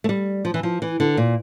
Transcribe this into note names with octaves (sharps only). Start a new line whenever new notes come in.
A3
G3
F3
E3
F3
E3
D3
A#2